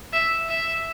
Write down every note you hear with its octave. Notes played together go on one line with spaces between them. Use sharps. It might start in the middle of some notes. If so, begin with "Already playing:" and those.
E5
E5